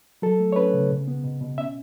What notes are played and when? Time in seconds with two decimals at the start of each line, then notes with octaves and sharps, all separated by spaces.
0.22 F#3 A4
0.40 A3
0.52 C#5
0.56 C#4 B4
0.74 C#3
0.91 B2
1.08 B3
1.24 B2
1.41 B2
1.58 C#4 E5